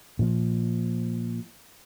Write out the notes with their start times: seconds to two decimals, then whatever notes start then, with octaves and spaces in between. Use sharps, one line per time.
0.19 A#2 F3